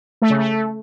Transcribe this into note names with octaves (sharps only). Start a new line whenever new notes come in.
A3
C#3
A3